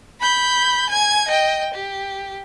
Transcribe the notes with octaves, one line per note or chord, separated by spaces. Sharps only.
B5 G6
G#5 G#6
D#5 G5
G4